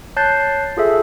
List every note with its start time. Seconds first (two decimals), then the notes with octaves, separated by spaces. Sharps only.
0.16 C#5 A5 F#6 G6 A6 C7
0.77 F4 G#4 A4 E5